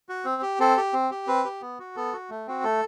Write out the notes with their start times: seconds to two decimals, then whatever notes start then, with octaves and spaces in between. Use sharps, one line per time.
0.09 F#4
0.25 C4
0.42 G4
0.59 C4 A4
0.77 G4
0.93 C4
1.11 G4
1.27 C4 B4
1.45 G4
1.61 B3
1.79 F#4
1.96 B3 A4
2.13 F#4
2.30 A3
2.47 C4 F#4
2.64 A3 A4